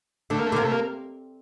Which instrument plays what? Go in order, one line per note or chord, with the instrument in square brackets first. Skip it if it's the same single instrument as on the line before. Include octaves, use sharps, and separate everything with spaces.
[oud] D3 [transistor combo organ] A3
[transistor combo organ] A#3
A3
[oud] D3
[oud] C3 [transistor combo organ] A#3
[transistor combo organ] A3
A#3